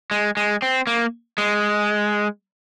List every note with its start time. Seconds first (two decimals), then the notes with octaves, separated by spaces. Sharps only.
0.11 G#3
0.37 G#3
0.62 C4
0.87 A#3
1.38 G#3